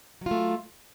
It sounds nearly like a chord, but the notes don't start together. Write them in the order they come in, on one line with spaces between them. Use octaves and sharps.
F#3 F4 A3